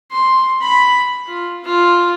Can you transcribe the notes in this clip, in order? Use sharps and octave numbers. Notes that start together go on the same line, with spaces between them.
C6
B5
F4
F4